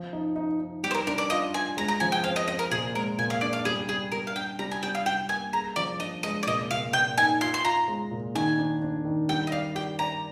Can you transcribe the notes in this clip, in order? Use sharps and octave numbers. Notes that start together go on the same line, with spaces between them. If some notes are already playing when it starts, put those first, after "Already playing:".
Already playing: F3
D#4
D#4
D#4
G3 G4
C5
A#4
D4 A#4
D5
F4 D#5
F4 G#5
G#3 A#5
A#5
F3 G#5
G5
C4 F5
D#5
C4 D#5
A#4
A#2 G#4
G#3 A#4
A#2 G#5
F5
D4 D5
F5
G3 G#4
G3 G#4
G3 A#4
F5
D4 G5
G3 A#5
G#5
G3 G5
F5
G3 G5
A#3 G#5
G#4 A#5
F3 D5
D4 D#5
G#3 D#5
D5
A#2 D#5
A#2 F5
A#2 G5
D#4 G#5
F4 C6
C6
F4 A#5
G#3
A#2
D#3 G#5
D4
D4
D#3
G3 G5
D#5
D5 F5
G4 G5
D5 A#5